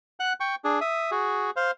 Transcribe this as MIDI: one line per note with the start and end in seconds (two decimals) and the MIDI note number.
0.20 0.33 78
0.20 0.33 90
0.40 0.55 79
0.40 0.55 85
0.64 0.80 62
0.64 0.80 68
0.81 1.11 76
0.81 1.11 87
1.11 1.51 66
1.11 1.51 68
1.56 1.71 72
1.56 1.71 77